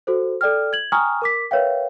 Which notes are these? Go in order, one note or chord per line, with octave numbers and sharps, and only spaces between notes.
F#4 A4 C5
A4 D5 G5 F6
G#6 F#7
G5 G#5 A#5 C#6 D#6 F6
A#4 D6 B6
A#4 B4 C#5 E5 F5 G5